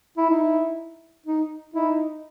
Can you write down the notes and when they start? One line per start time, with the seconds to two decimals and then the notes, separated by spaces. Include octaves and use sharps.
0.18 E4
0.30 D#4 E4
1.26 D#4
1.74 D#4 E4